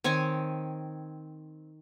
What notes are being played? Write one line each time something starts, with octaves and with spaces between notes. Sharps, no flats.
D#3 C4 C#5 G#5